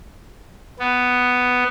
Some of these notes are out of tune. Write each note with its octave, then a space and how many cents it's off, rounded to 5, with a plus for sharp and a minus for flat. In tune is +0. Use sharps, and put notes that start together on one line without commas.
B3 +5